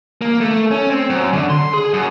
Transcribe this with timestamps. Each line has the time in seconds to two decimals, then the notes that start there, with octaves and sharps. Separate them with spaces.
0.21 A#3
0.40 A3
0.71 C#4
0.90 C4
1.10 F#2
1.33 D3
1.50 C6
1.74 G#4
1.93 F#2